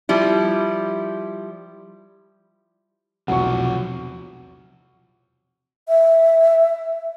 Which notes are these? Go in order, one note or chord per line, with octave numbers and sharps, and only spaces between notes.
F3 G3 E4
B1 E2 C3 F3 F#3 F#5 C#6
E5